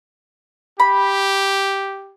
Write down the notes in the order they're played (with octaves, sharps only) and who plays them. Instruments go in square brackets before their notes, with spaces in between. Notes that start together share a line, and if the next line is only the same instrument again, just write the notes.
[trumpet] G4 [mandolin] B5